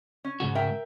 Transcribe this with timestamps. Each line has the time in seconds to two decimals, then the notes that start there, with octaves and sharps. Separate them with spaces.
0.25 C#4
0.40 G#2 C#3 F#4
0.55 A#4 E5 G5